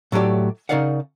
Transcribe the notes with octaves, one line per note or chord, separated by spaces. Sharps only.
A2 F#3 A3 G4 D5
C#3 D#4 A#4 D5 F5 F#5